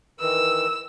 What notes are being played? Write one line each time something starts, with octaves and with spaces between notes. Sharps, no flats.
D#3 E3 E6